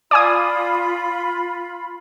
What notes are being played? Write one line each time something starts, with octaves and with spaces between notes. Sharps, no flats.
F4 D5 G#5 B5 D#6